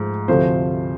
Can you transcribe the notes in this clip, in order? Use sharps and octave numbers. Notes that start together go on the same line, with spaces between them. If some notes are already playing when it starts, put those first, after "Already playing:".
Already playing: G#2 F3 A3
D2 C3 F3 A3 C5